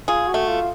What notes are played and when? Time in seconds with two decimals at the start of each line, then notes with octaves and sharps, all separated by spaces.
0.08 F4 G#4
0.28 F#4
0.34 A3
0.48 F4